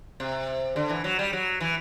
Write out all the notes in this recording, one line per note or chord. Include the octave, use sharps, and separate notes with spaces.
C3
D3
E3
F#3
G3
F#3
E3